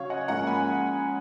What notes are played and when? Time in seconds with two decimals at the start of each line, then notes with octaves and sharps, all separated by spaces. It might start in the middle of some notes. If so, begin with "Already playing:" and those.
Already playing: C#3 F#3 C#4 C#5 F5
0.10 D#5 F#5
0.28 G#2 F3 A#3 C#4 F#5 A#5
0.47 G#5 B5